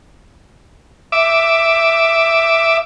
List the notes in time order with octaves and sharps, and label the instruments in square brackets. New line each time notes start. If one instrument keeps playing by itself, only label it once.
[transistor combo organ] E5 D6